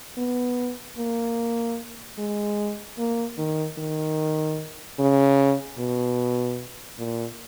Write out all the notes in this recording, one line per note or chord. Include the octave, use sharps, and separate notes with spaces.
B3
A#3
G#3
A#3
D#3
D#3
C#3
B2
A#2